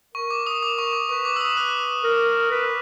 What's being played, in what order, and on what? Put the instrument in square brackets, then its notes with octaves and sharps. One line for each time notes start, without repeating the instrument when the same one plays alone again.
[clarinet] A#4 [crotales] C#6
[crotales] D6
D#6
D6
C#6
D6
[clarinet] B4 [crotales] C#6
[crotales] D6
E6
D#6
F#6
[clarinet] A#4
B4